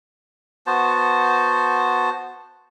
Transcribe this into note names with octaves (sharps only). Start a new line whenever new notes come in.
B3 F#4 C5 A5